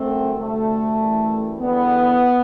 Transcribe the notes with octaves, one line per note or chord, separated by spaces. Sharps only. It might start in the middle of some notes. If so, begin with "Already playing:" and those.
Already playing: G1 F#2 F#3 A3 C4
D2 C3 G3 A3
F#2 E3 G3
E2 D3 G3 B3